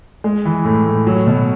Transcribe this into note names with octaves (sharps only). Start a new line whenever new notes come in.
G#3
E3
A2
A2
F#3
B2